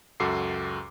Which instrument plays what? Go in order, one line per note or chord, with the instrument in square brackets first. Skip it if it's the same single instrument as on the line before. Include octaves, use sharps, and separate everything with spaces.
[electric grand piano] C#2 F#2 F#4 A4 D6 C7